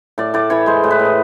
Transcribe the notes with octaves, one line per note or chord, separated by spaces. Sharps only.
A2 D5
A2 D5
E3 C#5
G#3 C5
A2
B4
A2
D#5